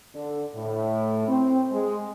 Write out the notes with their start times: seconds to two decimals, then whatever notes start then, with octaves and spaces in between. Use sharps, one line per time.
0.15 D3
0.55 A2
1.28 C4
1.72 G#3